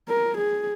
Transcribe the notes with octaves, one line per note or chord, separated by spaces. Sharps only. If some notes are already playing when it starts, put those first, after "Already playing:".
A#4
G#4